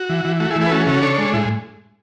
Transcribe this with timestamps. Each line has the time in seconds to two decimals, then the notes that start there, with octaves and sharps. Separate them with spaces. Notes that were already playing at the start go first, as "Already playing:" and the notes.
Already playing: F#4
0.09 E3
0.25 E3
0.40 A3 F#4
0.50 E4 G#4
0.56 E3
0.61 E4 G#4
0.66 B4
0.71 C#4 F#4 A4
0.80 G#4
0.87 C#3 F#4 A4
1.02 D4 A4 C#5
1.18 G#3
1.33 A2 E4